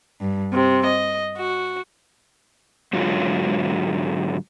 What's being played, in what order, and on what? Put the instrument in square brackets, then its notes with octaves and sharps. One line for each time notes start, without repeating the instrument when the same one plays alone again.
[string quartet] G2
C3
D#5
F#4
[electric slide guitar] G#2 D3 F#3 G#3 F4